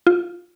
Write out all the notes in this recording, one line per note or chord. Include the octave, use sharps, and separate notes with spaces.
F4